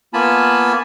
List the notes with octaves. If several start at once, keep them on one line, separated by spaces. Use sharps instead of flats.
A#3 B3 F4 G#5 A5 B5